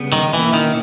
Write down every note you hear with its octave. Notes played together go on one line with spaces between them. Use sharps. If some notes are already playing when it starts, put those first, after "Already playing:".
Already playing: C#3 G3 B3
D#3
B2 E3 A#3 C#4 E4
D#3